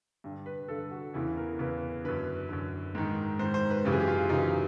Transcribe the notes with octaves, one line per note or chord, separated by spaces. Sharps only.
G2 D3
B4
G2 D3 A4
F#4
E2 C#3 E3 E4
A#4
E2 C#3 E3 B4
F#2 D3 B4
F#2 D3
G#2 D#3
G#2 D#3 C5
C5
B4
F#2 C#3 E3 G4
G#4
G4
F4
F#2 C#3 E3 D#4